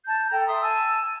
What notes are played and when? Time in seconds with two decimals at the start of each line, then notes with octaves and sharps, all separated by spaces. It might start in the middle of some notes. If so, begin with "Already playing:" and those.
0.06 A5 G6
0.29 A4 G5 A#5
0.47 E5 C6 D#6
0.61 G#5 A5 E6